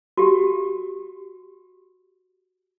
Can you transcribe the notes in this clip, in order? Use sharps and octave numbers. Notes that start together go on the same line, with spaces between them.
F#4 G4